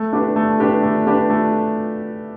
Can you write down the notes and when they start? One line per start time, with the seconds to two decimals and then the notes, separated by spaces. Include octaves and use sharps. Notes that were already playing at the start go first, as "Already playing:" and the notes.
Already playing: A3
0.13 D4 G4 B4
0.36 A3
0.60 D4 G4 B4
0.83 A3
1.07 D4 G4 B4
1.30 A3